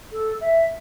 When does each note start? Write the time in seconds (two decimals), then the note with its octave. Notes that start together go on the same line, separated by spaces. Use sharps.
0.12 A4
0.41 E5